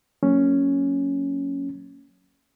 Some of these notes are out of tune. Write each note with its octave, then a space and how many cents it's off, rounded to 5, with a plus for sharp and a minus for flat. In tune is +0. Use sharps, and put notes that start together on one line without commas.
F#3 -15 A#3 -20 C#4 +0